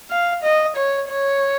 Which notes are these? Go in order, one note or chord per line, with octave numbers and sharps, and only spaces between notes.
F5
D#5
C#5
C#5